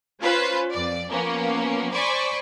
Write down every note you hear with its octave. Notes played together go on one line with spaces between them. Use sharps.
C#4 F4 B4 C5
F2 D5
F3 A#3 B3 C#4
C5 D5 G#5 B5 C#6